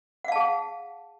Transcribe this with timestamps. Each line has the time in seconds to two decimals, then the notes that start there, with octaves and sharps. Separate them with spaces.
0.24 F#5
0.28 F5
0.32 A5
0.36 G#4